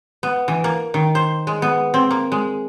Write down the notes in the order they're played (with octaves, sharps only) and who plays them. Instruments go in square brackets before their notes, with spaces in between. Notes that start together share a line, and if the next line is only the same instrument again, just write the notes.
[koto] B3
E3
A#3
D#3
C5
G#3
B3
C4
A#3
G#3